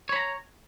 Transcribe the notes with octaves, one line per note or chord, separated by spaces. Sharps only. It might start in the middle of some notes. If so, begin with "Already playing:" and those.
C#5 A#5 B5